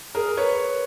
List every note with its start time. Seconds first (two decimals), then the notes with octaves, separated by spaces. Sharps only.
0.15 G#4 A#4
0.37 B4 C#5